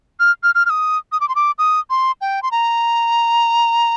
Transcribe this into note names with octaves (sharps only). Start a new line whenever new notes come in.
F6
F6
F6
F6
D#6
D#6
D6
C6
D6
D#6
C6
G5
C6
A#5